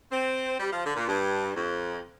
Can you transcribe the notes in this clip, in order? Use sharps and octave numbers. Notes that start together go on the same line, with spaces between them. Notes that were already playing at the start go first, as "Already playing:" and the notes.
C4
G3
F3
D3
A#2
G2
F2